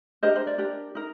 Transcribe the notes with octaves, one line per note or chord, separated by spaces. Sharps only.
D4 G4 A#4 C5 D#5
C5
D5
D4 G4 A#4
D#4 A#4